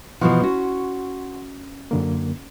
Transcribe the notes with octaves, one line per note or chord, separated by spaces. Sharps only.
B2 E3 F3 F#5 C6 C#6
C#4 F#4
F#2 D3 A#3